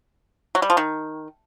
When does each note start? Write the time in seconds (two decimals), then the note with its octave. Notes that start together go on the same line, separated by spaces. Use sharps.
0.55 F#3
0.62 G3
0.70 F3
0.77 D#3